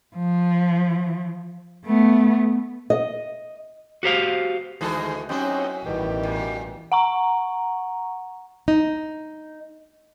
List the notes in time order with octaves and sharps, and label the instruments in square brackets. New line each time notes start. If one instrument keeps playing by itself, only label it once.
[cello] F3
A3 B3
[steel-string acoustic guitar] D#5
[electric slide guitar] F#4 G4 C5 F5
[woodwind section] D2 [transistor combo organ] D#3 G#3 C5 [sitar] E3 F#4 A4
[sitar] F#2 E4 F#4 [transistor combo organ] C4 D#4 G4 [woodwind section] C#4
[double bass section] A1 E3 [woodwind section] E2 B2 D#3 [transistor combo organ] G3
[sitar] A#2
[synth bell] F#5 A#5 C#6
[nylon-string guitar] D#4